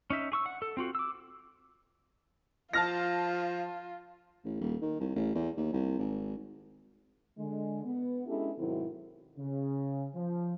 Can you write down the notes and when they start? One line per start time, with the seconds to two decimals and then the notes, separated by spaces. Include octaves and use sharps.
0.10 C#4 D#4 E5
0.32 G#4 C#6 E6
0.46 F#5
0.62 A4
0.77 C4 F4 F#4
0.95 D6 E6
2.73 F3 F4 A5 F6 A#6
4.45 A1
4.60 D#1
4.82 D#3
5.00 C2
5.15 A1
5.35 E2
5.57 D#2
5.72 C2
5.99 G#1
7.38 D3 G#3
7.84 B3
8.27 G#3 C#4 D4 E4 G4 A4
8.59 G#2 B2 D#3 F#3 C4 E4
9.38 C#3
10.15 F3